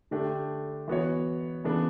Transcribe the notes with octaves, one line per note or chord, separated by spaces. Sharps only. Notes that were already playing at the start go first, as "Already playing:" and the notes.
D3 A3 D4 G4
E3 B3 F#4 C#5
C#3 E3 B3 D4